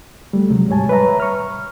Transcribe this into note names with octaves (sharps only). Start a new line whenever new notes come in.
G3 A3
D2 C3 F#3 G#3
G#2 G3 C#5 G#5 A5
B4 C#5 E5 A#5
C#6 F6